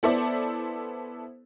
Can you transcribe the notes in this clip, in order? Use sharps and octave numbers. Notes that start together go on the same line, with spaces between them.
B3 E4 A4 C5 D5 E5